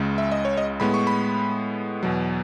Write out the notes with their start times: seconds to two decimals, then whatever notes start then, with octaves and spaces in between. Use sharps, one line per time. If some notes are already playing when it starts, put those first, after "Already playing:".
Already playing: C#2 C#3 G#3
0.18 E5
0.32 D#5
0.45 C#5
0.57 D#5
0.80 A2 G#3 B3 B5
0.94 C#6
1.07 B5
2.03 E2 B2 F#3